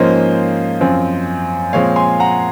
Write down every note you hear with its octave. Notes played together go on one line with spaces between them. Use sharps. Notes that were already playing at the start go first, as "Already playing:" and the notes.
Already playing: G#2 F3 A#3 C#4 C5 D#5
F#2 F3 C4
A#2 F3 G#3 C4 C#5 F5
G#5 C6
F#5 A#5